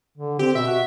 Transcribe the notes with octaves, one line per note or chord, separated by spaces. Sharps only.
D3
C4 G4
B2 E5
F#4